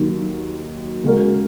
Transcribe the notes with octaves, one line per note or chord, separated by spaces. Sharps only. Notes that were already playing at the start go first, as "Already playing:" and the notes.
Already playing: D#2 D#3 F#3 D#4
C#3 G#3 F#4 A#4